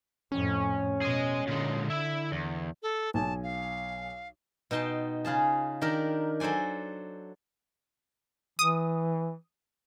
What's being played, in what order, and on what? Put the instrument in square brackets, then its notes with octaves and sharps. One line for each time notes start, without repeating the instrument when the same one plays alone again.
[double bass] F2 A2 [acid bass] C#4
[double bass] B2 [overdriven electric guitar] G#4 D#5
[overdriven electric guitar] A#2 G#3 [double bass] D3
[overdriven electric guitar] E4 E5
E2
[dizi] A4
[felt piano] B1 G#5 [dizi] A5
[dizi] F5
[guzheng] B2 D#4 G5 A5 C6
C#3 F4 G#4 A5
D#3 D4 G4 A#4
F#3 A4 C5 D5 G#5
[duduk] E3 [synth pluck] D#6